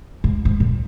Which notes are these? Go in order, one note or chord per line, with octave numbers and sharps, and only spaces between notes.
G#2
G#2
A#2